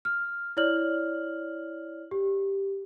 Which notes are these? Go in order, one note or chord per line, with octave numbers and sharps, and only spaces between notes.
F6
E4 C#5 D5 F6 F#7
G4